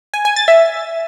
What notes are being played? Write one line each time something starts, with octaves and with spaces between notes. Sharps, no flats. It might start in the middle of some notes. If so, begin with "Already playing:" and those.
G#5
G#5
A6
E5